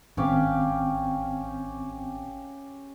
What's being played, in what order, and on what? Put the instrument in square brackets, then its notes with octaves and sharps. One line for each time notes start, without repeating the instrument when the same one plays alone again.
[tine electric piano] G#1 C4 [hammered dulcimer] C#4 G4 F5